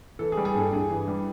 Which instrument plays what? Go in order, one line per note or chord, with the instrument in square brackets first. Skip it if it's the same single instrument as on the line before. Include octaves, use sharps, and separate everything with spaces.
[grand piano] E3 A4
G#4
G3
G#4
G2 A4
G2 G#4
E3
G3